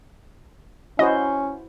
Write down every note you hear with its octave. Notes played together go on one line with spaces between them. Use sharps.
C#4 E4 F#4 C5 D#5